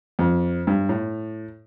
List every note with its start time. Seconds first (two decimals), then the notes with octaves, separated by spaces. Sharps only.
0.19 F2
0.67 G2
0.89 A2